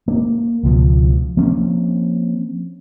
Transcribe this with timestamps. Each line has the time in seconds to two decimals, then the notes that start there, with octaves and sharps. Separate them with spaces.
0.08 A#3
0.63 C#2 B2 F3
1.37 F3 A#3 C4 C#4